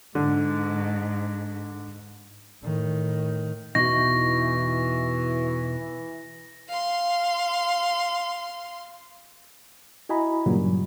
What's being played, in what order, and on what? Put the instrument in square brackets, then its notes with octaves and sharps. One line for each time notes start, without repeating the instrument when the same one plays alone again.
[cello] G#2 [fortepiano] D3
[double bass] A2 D#3
[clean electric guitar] E2 B2 D#4 [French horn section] E3 [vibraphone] F#4 C#6 [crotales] A#6
[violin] F5 C6
[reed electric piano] E4 F#4 D#5 G#5 A#5 B5
G2 A#2 C#3 E3 F#3 G3